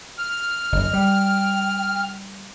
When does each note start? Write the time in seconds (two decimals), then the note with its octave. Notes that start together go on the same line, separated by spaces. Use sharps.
0.18 F6
0.72 F#1 D#5
0.93 G3 G5